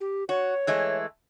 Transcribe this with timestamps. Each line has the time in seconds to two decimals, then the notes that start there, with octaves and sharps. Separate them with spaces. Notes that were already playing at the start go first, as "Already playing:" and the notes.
0.01 G4
0.29 F#4 C#5
0.67 E3 G#3 A3